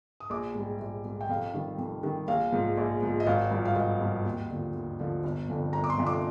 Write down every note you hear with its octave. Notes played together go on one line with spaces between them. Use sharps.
D#6
A#1 D6
G#2 G3
A#1
G#2 G3
G5
F2 F5
D#3 G3
F2
D#3 G3
A#1 F5
G#2 F3
A#1
G#2 F3
D#5
G#1 F5
G2 F3
F5
G#1 D#5
G2 F3
D#2
D3 F3
D#2
D3 F3
G1
F2 D3 F3
G1 A#5
D6
C6
F2 D3 F3
D6